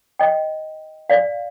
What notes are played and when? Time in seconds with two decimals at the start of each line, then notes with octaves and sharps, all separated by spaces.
0.19 D#5 G5
1.10 D5 F5